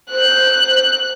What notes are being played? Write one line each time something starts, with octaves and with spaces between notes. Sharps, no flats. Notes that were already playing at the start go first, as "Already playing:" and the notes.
C5 F#6